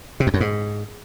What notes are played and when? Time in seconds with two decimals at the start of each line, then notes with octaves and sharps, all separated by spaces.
0.20 C3
0.27 F2
0.34 F#2
0.40 G#2